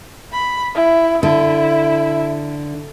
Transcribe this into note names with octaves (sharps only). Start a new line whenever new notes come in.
B5
E4
D3 E4